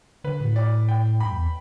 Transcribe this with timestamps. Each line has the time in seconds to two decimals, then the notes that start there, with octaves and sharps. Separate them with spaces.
0.24 D3 B4
0.40 A2
0.56 D5
0.88 G5
1.20 G2 B5
1.31 E2